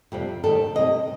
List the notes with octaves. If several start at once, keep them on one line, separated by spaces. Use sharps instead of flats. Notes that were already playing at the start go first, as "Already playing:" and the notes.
F2 C3 G3
D#2 D#3 G3 A4
D2 C3 G3 D#5